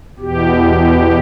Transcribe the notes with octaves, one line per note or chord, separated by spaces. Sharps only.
E2 B2 G4